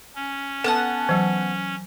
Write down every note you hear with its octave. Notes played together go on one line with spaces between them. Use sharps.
C#4
B3 A4 F#5 A5
E3 F#3